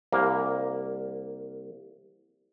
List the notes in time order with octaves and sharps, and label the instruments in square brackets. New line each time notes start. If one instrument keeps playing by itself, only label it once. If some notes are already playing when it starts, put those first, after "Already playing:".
[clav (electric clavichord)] C2 A#3